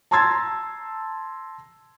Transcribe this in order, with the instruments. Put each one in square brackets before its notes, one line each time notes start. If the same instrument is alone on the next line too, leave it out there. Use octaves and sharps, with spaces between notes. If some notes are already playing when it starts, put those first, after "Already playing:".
[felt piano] A5 A#5 C6 E6 G#6 A6